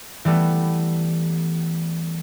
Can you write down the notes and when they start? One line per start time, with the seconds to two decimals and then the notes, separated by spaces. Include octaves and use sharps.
0.25 E3 G3 A3 B3